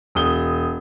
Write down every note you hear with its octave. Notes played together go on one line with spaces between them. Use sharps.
E1 D#6 G7